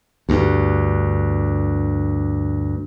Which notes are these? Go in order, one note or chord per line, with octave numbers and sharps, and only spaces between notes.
D2 G2